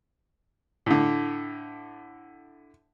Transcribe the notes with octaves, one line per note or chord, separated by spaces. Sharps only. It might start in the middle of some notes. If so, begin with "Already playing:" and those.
A2 D3